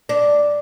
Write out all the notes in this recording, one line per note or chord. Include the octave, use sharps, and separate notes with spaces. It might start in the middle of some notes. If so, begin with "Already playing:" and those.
D4